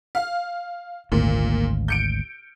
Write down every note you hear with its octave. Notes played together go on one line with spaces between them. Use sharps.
F5
G#1 D2 A#2
G6 C#7 D7